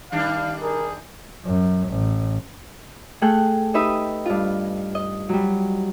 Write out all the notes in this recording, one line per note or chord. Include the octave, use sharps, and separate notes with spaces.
D#3 G3 D4 F5
G#4 A#4
F#2
A1
A3 G#4 A4 G5 F#6
D#4 G4 B4 E5 B5 D#6
G2 F4
D#5
F#3 G3